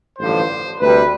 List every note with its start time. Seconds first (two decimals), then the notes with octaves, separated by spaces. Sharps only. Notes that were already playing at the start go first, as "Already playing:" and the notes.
0.19 A1 G2 D3 F3 C5
0.79 D2 C3 G3 B4